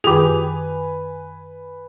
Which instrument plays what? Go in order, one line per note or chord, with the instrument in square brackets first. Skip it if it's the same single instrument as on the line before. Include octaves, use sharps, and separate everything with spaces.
[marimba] F#2 D#3 F4 [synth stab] G4 G#4 [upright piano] B4 G#5 F7